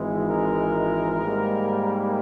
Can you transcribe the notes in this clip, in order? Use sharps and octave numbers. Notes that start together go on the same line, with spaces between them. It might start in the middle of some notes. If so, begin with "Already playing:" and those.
Already playing: G#1 G#2 E3 G#3
A#4
G#2 G3 A#3